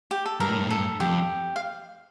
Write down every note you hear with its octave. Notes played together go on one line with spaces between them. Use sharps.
G4
A4
G2 A#4
A2
G2
A2 A4
G2
F2 G4
F5